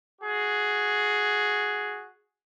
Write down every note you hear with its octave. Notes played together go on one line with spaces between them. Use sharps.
F#4 G#4